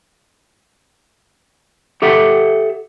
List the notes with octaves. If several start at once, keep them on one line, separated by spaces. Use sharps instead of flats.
G4 A4 E5 F#5